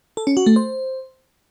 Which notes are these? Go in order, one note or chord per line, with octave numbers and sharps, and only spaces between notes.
A4
C#4
F#4
A3
C5